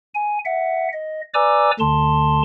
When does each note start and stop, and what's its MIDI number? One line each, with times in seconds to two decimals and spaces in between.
0.14 0.38 80
0.45 0.88 76
0.45 0.88 78
0.93 1.21 75
1.34 1.71 71
1.34 1.71 74
1.34 1.71 80
1.34 1.71 82
1.34 1.71 86
1.34 1.71 88
1.80 2.43 38
1.80 2.43 50
1.80 2.43 81
1.80 2.43 84